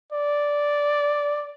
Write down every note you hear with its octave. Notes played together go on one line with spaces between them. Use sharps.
D5